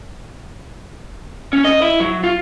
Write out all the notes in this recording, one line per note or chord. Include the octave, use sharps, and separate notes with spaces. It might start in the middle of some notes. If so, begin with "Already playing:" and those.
C#4
D#5
E4
F#3
F4